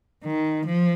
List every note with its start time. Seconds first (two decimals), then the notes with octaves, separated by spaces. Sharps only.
0.24 D#3
0.66 F3